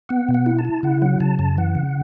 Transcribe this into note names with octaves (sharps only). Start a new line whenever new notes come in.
B3 F#5
B2
F#5
E4
A5
E4
C#3 F#5
F#3 F#5
C#3 A5
F#2 A5
E3 F#5
C#3